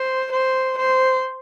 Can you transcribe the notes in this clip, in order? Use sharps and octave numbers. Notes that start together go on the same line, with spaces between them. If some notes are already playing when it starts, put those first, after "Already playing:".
Already playing: C5
C5
C5